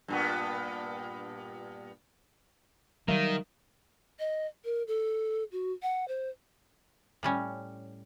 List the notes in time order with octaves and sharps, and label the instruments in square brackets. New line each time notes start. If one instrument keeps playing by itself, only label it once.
[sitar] G2 A#2 B3
[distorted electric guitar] D#3 [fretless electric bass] F#3 G3 [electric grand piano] A#4 E5 F5
[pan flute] D#5
A#4
A4
F#4
F#5
C5
[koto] A2 G3 C#4